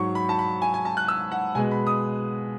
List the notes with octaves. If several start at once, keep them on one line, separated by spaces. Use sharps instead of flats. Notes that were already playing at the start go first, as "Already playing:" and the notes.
Already playing: G#2 F#3 C#6
B5
A5
B5
G#5
G#5
A5
F#6
E6
F#5
B2 G#3 G#5
B5
D#6